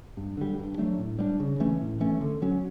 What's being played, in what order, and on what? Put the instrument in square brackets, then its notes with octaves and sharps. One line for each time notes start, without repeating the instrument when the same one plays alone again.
[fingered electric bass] G2
D3 G3
G2
F#3 A3 D4
A2
G3 B3 D4
C#3
E3 A3 C#4
A2
E3 A3 C#4
D3
F#3 C#4